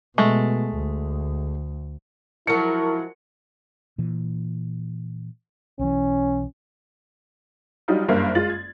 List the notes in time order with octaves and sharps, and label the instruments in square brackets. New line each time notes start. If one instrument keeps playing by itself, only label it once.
[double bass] B2 [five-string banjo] G#3 A3
[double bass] D2
[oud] F3 F#3 G#3 [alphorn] E4 [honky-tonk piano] A#4 C#7 [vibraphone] A5 C#6
[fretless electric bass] A#2 E3
[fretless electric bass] B1 E3 [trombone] C#4
[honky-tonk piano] F#3 G3 D4 D#4 F4
F#1 G2 A#3 C5 E5 F5
G#3 F4 A6 F#7
G#6